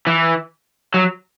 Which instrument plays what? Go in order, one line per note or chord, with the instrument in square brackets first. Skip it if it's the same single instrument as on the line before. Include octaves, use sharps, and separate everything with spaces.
[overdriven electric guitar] E3
F#3